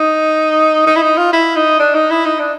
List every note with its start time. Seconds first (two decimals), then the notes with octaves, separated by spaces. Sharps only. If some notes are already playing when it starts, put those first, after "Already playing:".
Already playing: D#4
0.87 D#4
0.96 E4
1.02 D#4
1.18 F4
1.33 E4
1.56 D#4
1.80 D4
1.95 D#4
2.10 E4
2.25 D#4
2.39 D4